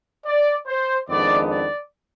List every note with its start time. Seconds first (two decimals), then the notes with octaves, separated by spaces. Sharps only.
0.25 D5
0.66 C5
1.08 F2 D#3 G#3 B3 D4 D5
1.49 D5